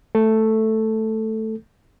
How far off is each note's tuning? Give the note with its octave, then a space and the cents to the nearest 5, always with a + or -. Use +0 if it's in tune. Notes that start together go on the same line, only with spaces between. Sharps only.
A3 +0 A4 +0